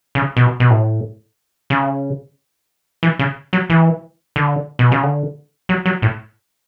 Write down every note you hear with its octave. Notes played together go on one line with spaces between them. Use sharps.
C#3
B2
B2
A2
C#3
E3
C#3
F#3
E3
D3
B2
C#3
D3
F#3
F#3
A2